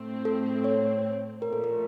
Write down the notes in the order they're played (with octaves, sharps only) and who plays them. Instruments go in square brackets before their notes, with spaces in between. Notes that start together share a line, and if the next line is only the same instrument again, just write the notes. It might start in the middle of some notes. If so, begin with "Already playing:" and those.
Already playing: [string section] A2 A3 C4
[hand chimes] A4
C#5
[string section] A#2 F3 A3 [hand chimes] A#4
[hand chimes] A4
A#4